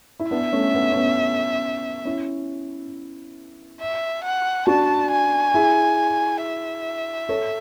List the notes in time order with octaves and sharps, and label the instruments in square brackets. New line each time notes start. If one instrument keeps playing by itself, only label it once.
[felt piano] E4
[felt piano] B3 D4 [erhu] E5
[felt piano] A3 C#4
B3
C#4
B3
C#4 E4
[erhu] E5
F#5
[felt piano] D4 F#4 [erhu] A5
[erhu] G#5
[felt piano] E4 G#4
[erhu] E5
[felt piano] A4 C#5